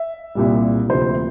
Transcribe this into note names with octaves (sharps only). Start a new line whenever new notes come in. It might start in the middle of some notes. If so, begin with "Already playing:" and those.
Already playing: E5
C2 A#2 G3
D2 C3 F3 C5